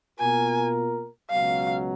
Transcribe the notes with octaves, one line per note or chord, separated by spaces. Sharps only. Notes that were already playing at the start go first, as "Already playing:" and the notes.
B2 A#3 F4 A#4 G#5
C#2 B2 F#3 F5